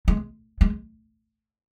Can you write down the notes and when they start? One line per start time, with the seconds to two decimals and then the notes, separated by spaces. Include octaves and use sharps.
0.08 G#3
0.61 G#3